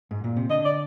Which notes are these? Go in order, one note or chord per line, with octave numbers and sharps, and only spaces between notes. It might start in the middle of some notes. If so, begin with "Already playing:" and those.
G#2
A#2
C3
D3 D#5
D5